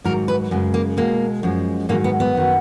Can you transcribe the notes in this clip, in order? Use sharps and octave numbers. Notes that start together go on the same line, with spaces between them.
G#2 D#3 F#3 A#4
B4
F#2 C#3 G#3
A#3
B2 G#3 A#3
F#2 F3 G#3
G#2 D#3 F#3 A#3
B3
B3
F#2 D#3 F#3